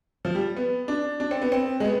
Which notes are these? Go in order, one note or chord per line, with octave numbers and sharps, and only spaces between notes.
F3
G3
B3
D4
D4
C4
B3
C4
G#3
B3